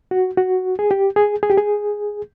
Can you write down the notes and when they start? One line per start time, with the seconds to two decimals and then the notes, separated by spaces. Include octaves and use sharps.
0.11 F#4
0.38 F#4
0.79 G#4
0.91 G4
1.16 G#4
1.43 G#4
1.50 G4
1.58 G#4